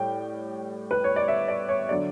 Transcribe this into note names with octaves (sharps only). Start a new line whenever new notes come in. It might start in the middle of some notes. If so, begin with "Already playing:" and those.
Already playing: A2 G3 G5
B4
C#5
D5
E5
D5
C#5
D3 F#3 D5